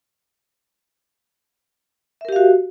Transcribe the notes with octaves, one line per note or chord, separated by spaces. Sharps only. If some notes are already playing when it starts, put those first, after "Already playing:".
F#4 G4 A#4 E5 F5